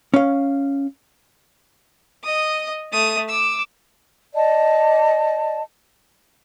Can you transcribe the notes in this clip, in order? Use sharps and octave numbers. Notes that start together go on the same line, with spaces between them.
C#4 F5
D#5 D#6
A3 D#6
D6 E6
D5 D#5 A5